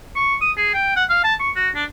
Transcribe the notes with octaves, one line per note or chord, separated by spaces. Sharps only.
C#6
D#6
G#4
G5
F#5
F5
A5
C#6
F#4
D4